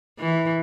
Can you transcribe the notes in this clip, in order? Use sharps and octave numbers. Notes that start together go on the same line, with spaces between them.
E3